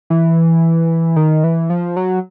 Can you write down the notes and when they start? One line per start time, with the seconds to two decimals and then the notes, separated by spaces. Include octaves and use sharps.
0.10 E3
1.16 D#3
1.44 E3
1.70 F3
1.97 F#3